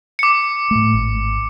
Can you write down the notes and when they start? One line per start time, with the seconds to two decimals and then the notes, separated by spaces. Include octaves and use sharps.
0.19 D6 C#7
0.71 A2 A3
0.94 G#1